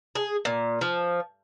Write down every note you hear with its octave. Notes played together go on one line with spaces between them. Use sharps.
G#4
A#2
F3